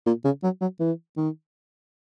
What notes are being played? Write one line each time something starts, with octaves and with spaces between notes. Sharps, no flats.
A#2
C#3
F#3
F#3
E3
D#3